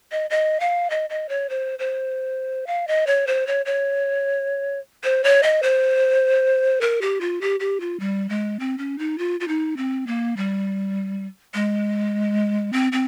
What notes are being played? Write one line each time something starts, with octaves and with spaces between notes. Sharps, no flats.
D#5
D#5
F5
D#5
D#5
C#5
C5
C5
F5
D#5
C#5
C5
C#5
C#5
C5
C#5
D#5
C5
A#4
G4
F4
G4
G4
F4
G3
G#3
C4
C#4
D#4
F4
F4
D#4
C4
A#3
G3
G#3
C4
C4